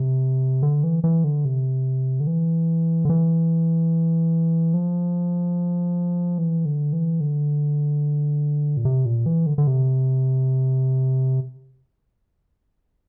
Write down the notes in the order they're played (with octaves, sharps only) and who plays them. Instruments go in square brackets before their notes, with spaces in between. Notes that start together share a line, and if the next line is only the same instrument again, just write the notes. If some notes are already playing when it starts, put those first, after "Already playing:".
Already playing: [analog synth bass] C3
D3
E3
E3
D3
C3
D3
E3
D3
E3
F3
E3
D3
E3
D3
A#2
C3
A#2
E3
D3
D3
C3